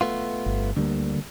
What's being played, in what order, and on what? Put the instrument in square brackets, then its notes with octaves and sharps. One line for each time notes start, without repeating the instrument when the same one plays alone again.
[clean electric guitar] A3 B3 F4
[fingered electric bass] G1
[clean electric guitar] D2 [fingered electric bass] D3 G3 A#3